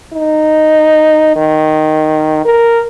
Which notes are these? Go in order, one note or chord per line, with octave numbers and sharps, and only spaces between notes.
D#4
D#3
A#4